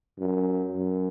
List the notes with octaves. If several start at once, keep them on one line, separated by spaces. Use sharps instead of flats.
F#2
F#2